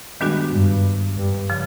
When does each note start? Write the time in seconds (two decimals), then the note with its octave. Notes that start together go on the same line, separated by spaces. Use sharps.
0.21 G2 D#3 G#3 B3 D4 F#4
0.53 G2
1.17 G2
1.50 C#3 F3